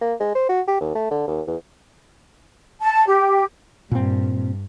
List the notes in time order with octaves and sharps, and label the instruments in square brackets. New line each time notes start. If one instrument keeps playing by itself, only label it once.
[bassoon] A#3
G#3
C5
F#4
G4
D#2
A3
D3
D#2
E2
[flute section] A5
G4
[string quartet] G2 [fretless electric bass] A#2 C4